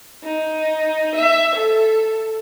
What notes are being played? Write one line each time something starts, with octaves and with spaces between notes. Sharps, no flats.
D#4
E5
A4